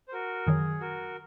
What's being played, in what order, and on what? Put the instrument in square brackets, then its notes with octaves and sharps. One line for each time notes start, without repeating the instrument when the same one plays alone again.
[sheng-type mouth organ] C5
F#4 A#4
[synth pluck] F#2 D#3 F#3 [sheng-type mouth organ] G#4
[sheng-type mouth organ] F#4 A#4